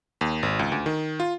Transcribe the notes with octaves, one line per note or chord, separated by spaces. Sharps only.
D#2
G#1
C#2
D2
D#3
F4